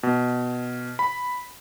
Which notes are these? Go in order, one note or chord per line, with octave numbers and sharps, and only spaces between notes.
B2
B5